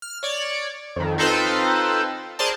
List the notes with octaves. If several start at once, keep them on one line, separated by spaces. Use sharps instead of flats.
F6
C#5 D5
F2 D#3
C4 D#4 F4 A4 B4 C5
G#4 A#4 C5 D5 A5